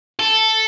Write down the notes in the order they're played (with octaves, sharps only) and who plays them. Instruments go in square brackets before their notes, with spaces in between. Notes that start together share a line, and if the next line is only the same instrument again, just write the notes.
[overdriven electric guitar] A4